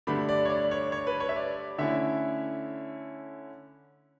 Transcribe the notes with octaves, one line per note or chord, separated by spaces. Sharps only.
G2 D3 A3 D4 B5
D5
C#5
D5
C#5
C#5
B4
C#5
E5
D5
D3 A3 C#4 E4 E5